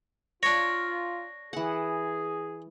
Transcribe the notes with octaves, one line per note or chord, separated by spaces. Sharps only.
D4 F4 C#5 A#6
E3 G#4 F#5